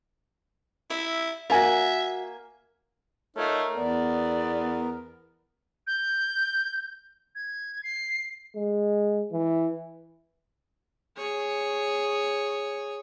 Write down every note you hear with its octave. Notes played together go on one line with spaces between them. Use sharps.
E4 E5
A#3 F4 F#4 E5 G#5
A3 D#4 F4 A#4 C#5 F6
E2 B3 D5
G6
G#6
C7
G#3
E3
G#4 C#5